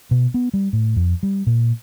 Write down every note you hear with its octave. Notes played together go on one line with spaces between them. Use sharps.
B2
B3
G3
A2
F2
G3
A#2